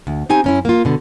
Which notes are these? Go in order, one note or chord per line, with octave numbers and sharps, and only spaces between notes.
D2
C4 D#4 G4 G#5
F#2 C#4 E4
A#3 F4
B2 D3